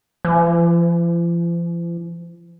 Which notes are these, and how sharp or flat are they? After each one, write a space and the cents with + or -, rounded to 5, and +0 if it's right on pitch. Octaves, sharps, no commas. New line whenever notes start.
F3 -45